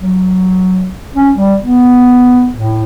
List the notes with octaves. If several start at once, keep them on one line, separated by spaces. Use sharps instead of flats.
F#3
C#4
G3
B3
A2